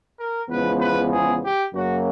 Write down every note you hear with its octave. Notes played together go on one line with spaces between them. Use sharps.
A#4
E2 C#3 F3 G#3 B3 B4
B4
G#4
G4
F#2 C#3 F#3 A#3 C#4 F#4